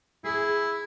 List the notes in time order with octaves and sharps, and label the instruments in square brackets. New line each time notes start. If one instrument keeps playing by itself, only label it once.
[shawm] E4 [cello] G#4